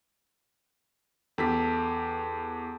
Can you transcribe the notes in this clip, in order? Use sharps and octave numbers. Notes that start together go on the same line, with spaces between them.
E2 G4 A4 B6